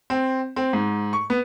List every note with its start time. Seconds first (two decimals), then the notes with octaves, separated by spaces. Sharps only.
0.10 C4
0.56 C4
0.73 G#2
1.13 C#6
1.30 B3